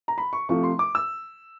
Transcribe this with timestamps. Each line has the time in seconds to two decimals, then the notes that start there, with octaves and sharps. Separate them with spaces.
0.08 A#5
0.18 B5
0.33 C#6
0.49 C3 F3 A3 C#6
0.63 C6
0.79 D6
0.95 E6